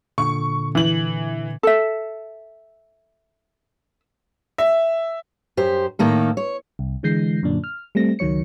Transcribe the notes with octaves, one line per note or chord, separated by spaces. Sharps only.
A#2 D3 C#6
E3 F#7
A4 E5
E5
F#2 G4 C5
A2 D#3 A#3 A4
C#5
C2
D3 E3 G#3 G6 A#6 C7
F#2 A#2 D3 D4
F6
G3 A3 C4 A#6
C#2 D#3 F#3 C#5 C#7